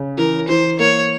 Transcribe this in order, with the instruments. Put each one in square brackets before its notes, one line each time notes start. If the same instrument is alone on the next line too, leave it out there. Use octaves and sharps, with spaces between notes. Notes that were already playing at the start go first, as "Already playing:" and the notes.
Already playing: [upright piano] C#3
[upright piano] E3 [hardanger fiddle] A#4
[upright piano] E3 [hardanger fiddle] C5
[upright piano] A#3 [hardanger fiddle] C#5